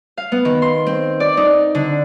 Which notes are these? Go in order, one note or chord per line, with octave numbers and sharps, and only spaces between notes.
F5
B3
D#3
C6
C4
D5
D#4
D3